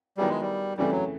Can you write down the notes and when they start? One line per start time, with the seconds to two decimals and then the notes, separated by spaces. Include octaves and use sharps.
0.17 D#3 F#3 G3 B3 E4 G#4
0.29 G#3
0.41 G3
0.77 F2 C#3 E3 G3 A3
0.91 F#3